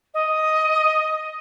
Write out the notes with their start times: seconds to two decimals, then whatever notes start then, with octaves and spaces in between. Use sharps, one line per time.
0.14 D#5